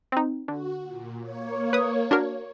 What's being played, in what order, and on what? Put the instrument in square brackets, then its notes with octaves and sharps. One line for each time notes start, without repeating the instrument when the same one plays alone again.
[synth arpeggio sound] C4 D#4
[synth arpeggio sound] D3 [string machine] F#4
[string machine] A#2
A#3 C#5
[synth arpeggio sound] B4 D#6
D4 F#4 A#4